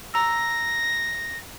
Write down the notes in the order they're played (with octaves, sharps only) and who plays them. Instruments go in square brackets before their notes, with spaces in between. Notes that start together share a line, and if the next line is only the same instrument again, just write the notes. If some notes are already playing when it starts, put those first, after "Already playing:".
[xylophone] A#5 E6 [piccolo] A#6